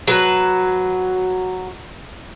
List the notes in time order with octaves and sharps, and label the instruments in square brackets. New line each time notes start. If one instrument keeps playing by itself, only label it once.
[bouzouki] F#3 B4